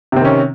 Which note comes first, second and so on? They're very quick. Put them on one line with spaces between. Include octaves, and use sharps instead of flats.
C3 C4 D#3 C#4